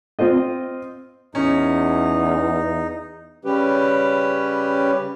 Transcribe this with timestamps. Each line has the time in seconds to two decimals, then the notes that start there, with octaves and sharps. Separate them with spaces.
0.19 C4 F4 C5 D#5
1.35 E2 C#4 D#4
3.45 C#3 G3 C#4 G4 B4